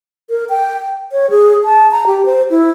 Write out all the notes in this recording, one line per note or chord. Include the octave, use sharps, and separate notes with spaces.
A#4
G5
C#5
G#4
A5
A#5
G4
C5
E4